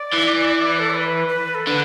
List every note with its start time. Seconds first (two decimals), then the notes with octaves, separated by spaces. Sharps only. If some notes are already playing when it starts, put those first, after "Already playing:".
Already playing: D5
0.13 E3
0.79 A4
0.90 D5
0.95 B4
1.29 B4
1.55 A4
1.67 D3 B4